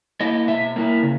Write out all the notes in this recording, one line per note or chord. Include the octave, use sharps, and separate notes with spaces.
A#3 E4 D#5
B2 E5
A#3 E4
C#3